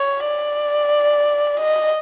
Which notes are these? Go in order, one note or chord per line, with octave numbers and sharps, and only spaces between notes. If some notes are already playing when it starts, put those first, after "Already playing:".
Already playing: C#5
D5
D#5